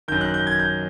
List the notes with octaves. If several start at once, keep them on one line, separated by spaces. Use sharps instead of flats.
F#2 D#3 G6
F#6
G6
G#6
G6